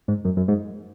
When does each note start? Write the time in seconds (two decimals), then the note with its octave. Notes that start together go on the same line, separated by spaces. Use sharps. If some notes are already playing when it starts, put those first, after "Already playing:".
0.08 G#2
0.25 F#2
0.37 F#2
0.48 G#2